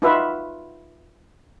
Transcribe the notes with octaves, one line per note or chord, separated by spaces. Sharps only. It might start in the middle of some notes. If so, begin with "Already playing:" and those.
D#4 F4 F#4 B4 E5